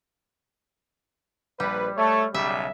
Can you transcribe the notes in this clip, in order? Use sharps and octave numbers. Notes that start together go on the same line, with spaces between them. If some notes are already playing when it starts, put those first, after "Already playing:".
A#1 G3 B4
A3 C#5
B1 C#3 G3 E5